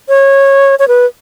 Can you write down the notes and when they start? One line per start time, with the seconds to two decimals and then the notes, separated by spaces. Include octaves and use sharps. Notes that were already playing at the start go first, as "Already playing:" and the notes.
0.09 C#5
0.79 C#5
0.88 B4